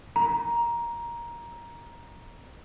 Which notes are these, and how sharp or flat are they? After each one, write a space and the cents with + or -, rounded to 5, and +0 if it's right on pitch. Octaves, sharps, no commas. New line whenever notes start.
A#5 +10